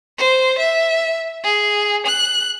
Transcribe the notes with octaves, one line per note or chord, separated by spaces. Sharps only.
C5
E5
G#4
F#6